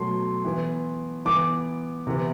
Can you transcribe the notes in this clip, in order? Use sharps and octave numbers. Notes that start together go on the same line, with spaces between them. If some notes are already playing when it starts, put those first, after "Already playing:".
Already playing: B2 F#3 A3 C6
E3 B3
E3 B3 D6
C3 E3 B3